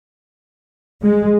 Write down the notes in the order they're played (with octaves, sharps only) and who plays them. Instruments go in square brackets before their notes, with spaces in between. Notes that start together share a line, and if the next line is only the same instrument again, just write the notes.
[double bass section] G#3